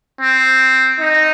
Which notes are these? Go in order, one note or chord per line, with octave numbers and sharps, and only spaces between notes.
C4
D#4